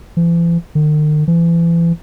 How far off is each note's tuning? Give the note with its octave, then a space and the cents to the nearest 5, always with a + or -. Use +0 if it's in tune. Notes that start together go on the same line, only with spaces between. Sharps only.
E3 +45
D#3 -45
E3 +35